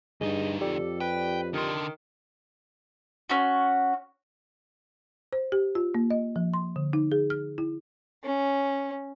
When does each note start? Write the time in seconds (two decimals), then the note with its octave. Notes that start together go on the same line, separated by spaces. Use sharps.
0.21 D2 G2 D#4 G#4 D#5
0.61 F2 G4 A4 D5
1.00 B4 G5
1.54 D3 D#3 C6
3.30 C#4 F#4
5.33 C5
5.52 G4
5.75 F4
5.95 A#3
6.11 D#5
6.36 F3
6.54 C6
6.76 D3
6.93 D#4
7.12 G#4
7.30 F6
7.58 E4
8.24 C#4